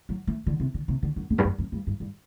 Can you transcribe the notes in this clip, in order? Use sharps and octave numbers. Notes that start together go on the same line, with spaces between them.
F#3
A3
D3
C3
D3
C3
D3
F#2
E2
G2
F#2
F#2
G2
G2
G2